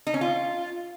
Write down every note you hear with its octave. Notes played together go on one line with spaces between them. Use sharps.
D#4
C#4
F4